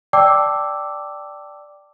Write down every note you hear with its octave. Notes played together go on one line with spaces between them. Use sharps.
D5 G5 A5 D6 E6